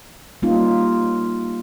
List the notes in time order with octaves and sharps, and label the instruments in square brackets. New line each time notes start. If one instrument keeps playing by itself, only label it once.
[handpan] G3 A#3 C#4 D#4 F4